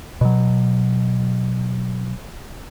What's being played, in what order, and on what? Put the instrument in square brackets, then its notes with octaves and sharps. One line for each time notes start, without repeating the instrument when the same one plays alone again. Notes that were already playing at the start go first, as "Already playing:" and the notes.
[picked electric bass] B2 F#3